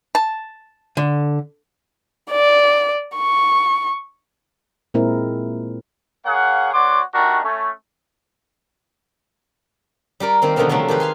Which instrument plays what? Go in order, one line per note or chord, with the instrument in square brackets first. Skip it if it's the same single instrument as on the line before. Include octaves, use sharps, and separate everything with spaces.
[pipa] A5
[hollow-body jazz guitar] D3
[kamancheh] D5
C#6
[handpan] A#2 G#3 C4 E4 A#4
[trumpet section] A#3 G#4 C#5 F5 F#5
B3 F#4 C#5 D5 C6 D6
G3 A3 D4 D#4 F#4 A#4
A3 C#4
[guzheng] G3 G4 A#4 D5
D#3 A#3 C4 A#4
B2 D3 D#3 F3 B3 C4
C3 D#3 F3 F#3 A3 D4
D#3 G4 G#4 B4 C5
F5 G#5 C6